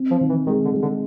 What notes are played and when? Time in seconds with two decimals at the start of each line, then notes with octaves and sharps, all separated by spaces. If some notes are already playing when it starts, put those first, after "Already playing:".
Already playing: C4
0.11 F3
0.21 D#3
0.29 E3
0.46 D#3 G#3
0.65 D3
0.74 G#3
0.82 D3